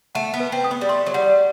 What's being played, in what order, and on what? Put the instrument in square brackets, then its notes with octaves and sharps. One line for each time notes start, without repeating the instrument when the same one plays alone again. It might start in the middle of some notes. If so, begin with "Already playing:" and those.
[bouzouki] A3 [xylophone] F#5
[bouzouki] B3
[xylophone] B4
[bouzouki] C4
[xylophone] D#6
[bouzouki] B3
G3
[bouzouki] A3 [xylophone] C6
[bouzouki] F#3
[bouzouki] G3 [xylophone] F#5